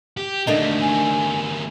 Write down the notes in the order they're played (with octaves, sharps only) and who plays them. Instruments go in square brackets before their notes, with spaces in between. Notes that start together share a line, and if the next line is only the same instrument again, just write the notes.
[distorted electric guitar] G4
[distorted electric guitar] D2 A#3 [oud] A3 D4 D#4
[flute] G#5